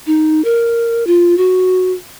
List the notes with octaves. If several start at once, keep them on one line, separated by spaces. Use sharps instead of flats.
D#4
A#4
F4
F#4